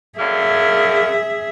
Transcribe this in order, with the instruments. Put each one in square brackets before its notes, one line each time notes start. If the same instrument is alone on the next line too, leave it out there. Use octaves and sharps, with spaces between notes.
[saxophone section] F#2 D3 A#3 [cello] G#4 E5